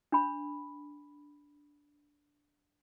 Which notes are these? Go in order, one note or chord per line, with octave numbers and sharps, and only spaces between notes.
D4 B5